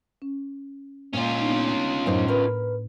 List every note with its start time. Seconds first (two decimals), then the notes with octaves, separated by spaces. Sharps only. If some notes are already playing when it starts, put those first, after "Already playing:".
0.22 C#4
1.14 A#2 C#4 F4
1.40 B3 D4 D#4
2.06 F#2 A2 D#4 C5
2.28 A#4 B4